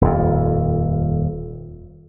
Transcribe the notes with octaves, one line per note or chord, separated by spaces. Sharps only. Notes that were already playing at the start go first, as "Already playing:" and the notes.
D#1 F2